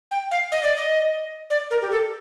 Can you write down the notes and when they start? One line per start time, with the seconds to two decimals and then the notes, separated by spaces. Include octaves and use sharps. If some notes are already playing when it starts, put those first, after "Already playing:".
0.11 G5
0.31 F5
0.52 D#5
0.63 D5
0.76 D#5
1.50 D5
1.71 A#4
1.82 G4
1.91 A4